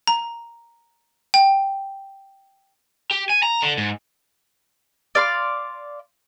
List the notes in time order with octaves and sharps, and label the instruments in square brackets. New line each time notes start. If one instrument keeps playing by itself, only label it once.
[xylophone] A#5
G5
[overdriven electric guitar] G4
G#5
A#5
D3
G#2
[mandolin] D5 F5 C6